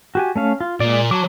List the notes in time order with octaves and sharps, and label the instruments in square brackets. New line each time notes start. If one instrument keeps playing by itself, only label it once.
[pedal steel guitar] F#4 G4 G#5
A3 C#4 F5
F4
[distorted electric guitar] A#2 [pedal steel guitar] G#3 D5
[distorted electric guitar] F#3 [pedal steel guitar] A5 D6